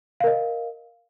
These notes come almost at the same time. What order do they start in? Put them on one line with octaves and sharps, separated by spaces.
F5 A#4 D#5